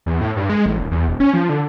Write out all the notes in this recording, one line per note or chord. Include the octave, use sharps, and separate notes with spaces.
E2
A2
G2
G#3
A1
D#1
E2
E1
C#4
F3
D3